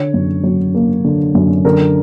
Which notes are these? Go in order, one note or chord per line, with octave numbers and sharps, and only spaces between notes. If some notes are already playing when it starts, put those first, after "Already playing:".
Already playing: D3 C#5
F#2
F#3
A#3
D3
F#2
D3 A#4